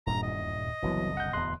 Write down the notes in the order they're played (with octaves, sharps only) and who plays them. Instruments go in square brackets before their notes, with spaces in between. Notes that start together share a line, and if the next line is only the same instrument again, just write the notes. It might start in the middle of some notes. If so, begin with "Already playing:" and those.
[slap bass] D#1 E2 [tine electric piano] G2 A#2 [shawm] A#5
[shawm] D#5
[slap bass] F#1 C2 D3 [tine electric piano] E3 F#3 B3
[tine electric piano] F#5 G6
[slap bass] D1 E2 B3 [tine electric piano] C6 F#6